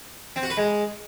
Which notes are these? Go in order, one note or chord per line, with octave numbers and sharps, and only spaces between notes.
C4
F#4
B4
G#3